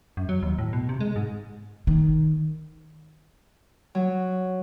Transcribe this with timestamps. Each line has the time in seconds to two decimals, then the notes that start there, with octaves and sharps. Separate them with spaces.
0.17 F#2
0.29 F#3
0.42 D#2
0.59 A2
0.73 B2
0.89 C3
1.00 G#3
1.16 G#2
1.87 D#3
3.95 F#3